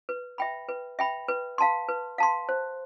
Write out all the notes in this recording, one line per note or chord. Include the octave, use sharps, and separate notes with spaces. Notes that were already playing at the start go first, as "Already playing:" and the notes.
B4
E5 G5 B5
B4
E5 G5 B5
B4
F5 A5 C6
B4
F5 A5 C6
C5